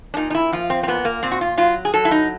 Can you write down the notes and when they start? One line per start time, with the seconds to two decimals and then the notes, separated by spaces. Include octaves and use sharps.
0.14 D4
0.17 A#2 D#4
0.30 D#4
0.35 E4
0.53 F3 F4
0.70 C4
0.83 C4
0.88 A#2 B3
1.05 A#3
1.23 A#2 C4
1.31 F#4
1.41 F4
1.57 F#3 F4
1.85 G#4
1.94 F#3 A4
2.05 E4
2.11 D#4